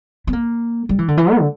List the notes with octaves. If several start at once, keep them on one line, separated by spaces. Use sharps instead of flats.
B3
A#3
G3
E3
D3
E3
B3
D3